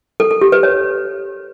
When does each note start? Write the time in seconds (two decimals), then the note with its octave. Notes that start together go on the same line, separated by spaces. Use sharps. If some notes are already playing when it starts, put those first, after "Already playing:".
0.20 A4
0.31 A4
0.42 G4
0.52 B4
0.63 C#5